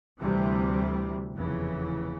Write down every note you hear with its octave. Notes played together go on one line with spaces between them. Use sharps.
D2 C3 E3 G3
F1 E2 C#3 E3